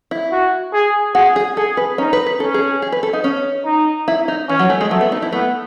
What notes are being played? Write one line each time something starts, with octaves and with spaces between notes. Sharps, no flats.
E4
F#4
G#4
F#4 G#4
G#4
G#4 A4
B4
C#4 D#4
B4
B4
C#4 A4
G#4
G#4
B4
A4
D#4
C#4
D#4
E4
D#4
E3 C#4
F#3
A3
G#3
F#3 A3
B3
D#4
E4
A3 B3